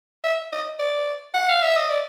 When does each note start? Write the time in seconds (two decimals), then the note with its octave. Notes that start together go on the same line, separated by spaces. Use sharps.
0.24 E5
0.53 D#5
0.79 D5
1.34 F#5
1.49 F5
1.62 E5
1.77 D#5
1.90 D5